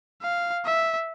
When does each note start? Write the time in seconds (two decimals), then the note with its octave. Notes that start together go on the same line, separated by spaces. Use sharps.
0.22 F5
0.65 E5